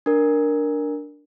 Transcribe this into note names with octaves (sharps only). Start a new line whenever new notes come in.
D4 A#4